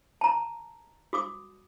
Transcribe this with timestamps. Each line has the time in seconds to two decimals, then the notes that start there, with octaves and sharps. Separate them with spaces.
0.21 A5 A#5
1.13 F#4 D6 D#6